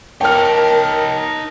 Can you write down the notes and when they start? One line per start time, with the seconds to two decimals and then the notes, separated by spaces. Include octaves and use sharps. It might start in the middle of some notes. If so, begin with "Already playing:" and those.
0.21 D#4 A#4 C#5 G5 A5 F6